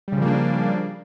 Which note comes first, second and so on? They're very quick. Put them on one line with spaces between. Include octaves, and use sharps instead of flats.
G3 C#3 F3 A#3 D4